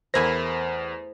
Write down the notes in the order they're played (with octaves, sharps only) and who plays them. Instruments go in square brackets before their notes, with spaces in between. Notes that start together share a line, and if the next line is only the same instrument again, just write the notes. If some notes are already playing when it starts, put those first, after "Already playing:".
[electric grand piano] E2 A#4 A#6 [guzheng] A3 E4 G#5 [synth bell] C5